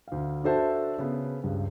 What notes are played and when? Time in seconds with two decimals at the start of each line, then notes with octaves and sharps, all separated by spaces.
0.08 D2 F5
0.44 D4 F#4 A4 C5 E5 A5
0.98 C#3 B3
1.44 C#2 G2